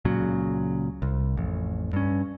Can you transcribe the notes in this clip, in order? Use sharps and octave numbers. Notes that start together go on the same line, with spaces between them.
C#2 A#2 C#3 F#3
C2
A1 F2
G2 C#4